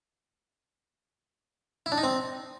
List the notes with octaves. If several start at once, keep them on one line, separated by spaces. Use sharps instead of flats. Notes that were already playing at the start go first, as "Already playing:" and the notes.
E4
D4
D#4
C4